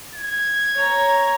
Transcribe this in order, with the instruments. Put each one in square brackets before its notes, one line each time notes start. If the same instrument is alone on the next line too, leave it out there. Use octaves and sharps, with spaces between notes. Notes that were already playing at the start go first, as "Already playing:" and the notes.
[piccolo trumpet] G#6
[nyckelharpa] C#5 A#5